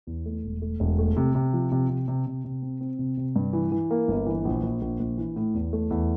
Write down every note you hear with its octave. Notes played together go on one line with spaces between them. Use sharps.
E2
A3
E1
A3
E1
A3
C3
C3
F3
C3
C3
C3
C3
C3
C4
C4
C3
C3
G2
E3
E3
A#3
G1
E3
A#1
A#1
A#1
A#1
E3
A2
E2
A3
E2